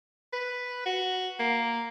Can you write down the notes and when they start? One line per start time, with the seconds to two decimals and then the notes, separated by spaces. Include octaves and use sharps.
0.32 B4
0.86 F#4
1.39 A#3